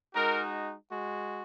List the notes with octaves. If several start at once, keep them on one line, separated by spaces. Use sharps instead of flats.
G#3 D#4 F#4 A#4
G#3 F#4